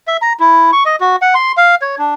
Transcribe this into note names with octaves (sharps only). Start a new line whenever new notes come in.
E5
A#5
E4
C#6
D#5
F#4
F#5
C6
F5
C#5
D4